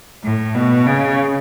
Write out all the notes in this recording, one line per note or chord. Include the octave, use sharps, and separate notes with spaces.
A2
B2
C#3